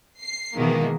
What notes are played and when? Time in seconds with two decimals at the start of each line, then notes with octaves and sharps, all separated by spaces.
0.21 C7
0.55 B2 D#3 E3 G#3 A#3